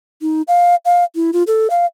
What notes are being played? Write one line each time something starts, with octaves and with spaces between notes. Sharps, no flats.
D#4
F5
F5
E4
F4
A4
F5